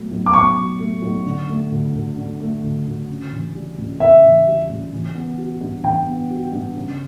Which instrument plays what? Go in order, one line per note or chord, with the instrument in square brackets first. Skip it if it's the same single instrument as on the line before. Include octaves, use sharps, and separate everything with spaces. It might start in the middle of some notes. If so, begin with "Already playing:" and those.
Already playing: [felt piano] B2 F#3 A3
B1
[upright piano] D6
[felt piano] B2 [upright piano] C#6
[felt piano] F#3
A3
B1
D3
A3
D2
D2
D3
A3
D2
D2
C#3
E3
G3
C#2
[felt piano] C#3 [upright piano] E5
[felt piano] E3
G3
C#2
E3
B3
F#4
G2
[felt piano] E3 [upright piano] G5
[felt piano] B3
F#4
G2
C#3